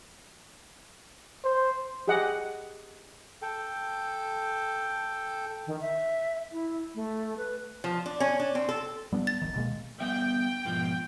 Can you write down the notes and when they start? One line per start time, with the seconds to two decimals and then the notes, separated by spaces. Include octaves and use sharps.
1.44 C5
2.08 G4 G#4 D#5 F#5
3.42 A4 G5
5.67 D#3
5.81 E5
6.52 E4
6.95 A3
7.37 B4
7.84 F3
8.06 D4
8.20 C#4
8.40 D4
8.55 C4
8.69 A4
9.12 G3 B3 D4
9.27 A6
9.42 D1 A1 D#3
9.56 B2 G#3 A#3
10.00 G3 B3 E5 G5
10.65 G#2 B2 F3